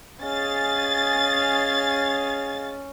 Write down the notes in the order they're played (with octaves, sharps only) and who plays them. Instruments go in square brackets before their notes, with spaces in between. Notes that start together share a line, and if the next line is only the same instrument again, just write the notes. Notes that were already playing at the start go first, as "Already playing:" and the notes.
[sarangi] C#4 [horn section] G#4 D#5 F5 [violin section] A6